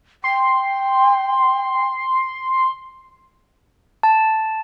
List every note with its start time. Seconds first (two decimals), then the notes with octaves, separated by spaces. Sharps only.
0.24 G5 C6
4.03 A5